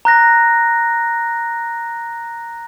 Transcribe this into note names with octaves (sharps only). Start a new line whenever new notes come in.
A#5 F#6 A#6